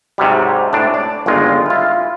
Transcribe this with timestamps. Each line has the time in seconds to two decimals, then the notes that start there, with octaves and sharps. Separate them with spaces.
0.18 G#2 C3 F#3 G3
0.73 A2 D4
0.94 D5
1.26 G1 A#2 D#3 G#3 F4
1.66 E4 F4